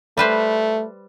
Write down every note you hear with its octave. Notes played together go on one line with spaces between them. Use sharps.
G3 A3 B4 C5